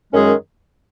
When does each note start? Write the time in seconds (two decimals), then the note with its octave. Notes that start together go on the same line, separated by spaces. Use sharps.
0.12 F#2 D#3 G#3 C#4 G#4